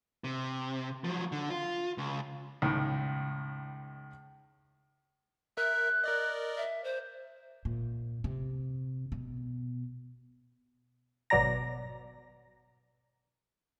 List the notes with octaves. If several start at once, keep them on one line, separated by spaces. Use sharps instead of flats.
C3
F3 F#3
D3
F4
C#2
C#2 A2 D#3
A#4 E5 F#6
A#4 D5 D#5
E5
C5
A#2
C3
B2
G#1 B2 F#3 D5 A#5 A#6